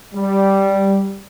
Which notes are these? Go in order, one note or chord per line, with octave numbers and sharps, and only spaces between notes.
G3